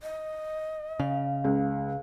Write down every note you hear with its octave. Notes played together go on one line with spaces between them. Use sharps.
D#5
C#3 F5
C#2